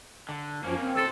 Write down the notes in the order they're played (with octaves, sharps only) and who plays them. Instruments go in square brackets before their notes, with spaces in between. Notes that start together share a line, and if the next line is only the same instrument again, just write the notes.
[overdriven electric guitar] D3
[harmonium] F#2 F3 [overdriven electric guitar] A#3 C#4
[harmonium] C4
[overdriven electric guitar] B1 C5 [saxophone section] A4